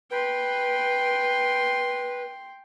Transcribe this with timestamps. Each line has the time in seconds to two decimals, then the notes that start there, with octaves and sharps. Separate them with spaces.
0.11 B4 G5 C6